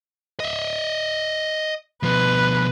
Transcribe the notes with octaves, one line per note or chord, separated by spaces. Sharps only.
D#5 E5
B2 F3 B4